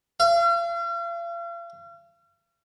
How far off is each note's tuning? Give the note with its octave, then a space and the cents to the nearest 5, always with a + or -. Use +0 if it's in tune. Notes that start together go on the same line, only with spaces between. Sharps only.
F5 -40